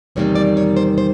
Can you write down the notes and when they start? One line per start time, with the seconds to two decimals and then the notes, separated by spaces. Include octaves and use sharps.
0.16 E2 C3 D#3 G3 A#3 C#5
0.35 D5
0.57 C#5
0.77 C5
0.98 C5